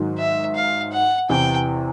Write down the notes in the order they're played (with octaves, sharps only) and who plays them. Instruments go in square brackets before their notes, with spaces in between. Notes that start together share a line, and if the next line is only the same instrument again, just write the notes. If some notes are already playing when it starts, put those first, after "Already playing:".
Already playing: [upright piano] G#2 D#3 F#3
[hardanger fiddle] E5
F5
F#5
[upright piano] E2 C3 E3 [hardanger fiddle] G5